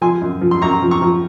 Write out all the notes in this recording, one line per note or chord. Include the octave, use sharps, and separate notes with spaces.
F3 G#5 C6
F#2
F3
C6
F#2 A#5 C#6
F3
A#5 C#6
F3